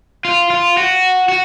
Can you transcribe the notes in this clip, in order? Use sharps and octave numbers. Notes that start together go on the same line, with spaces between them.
F4
F4
F#4
F#4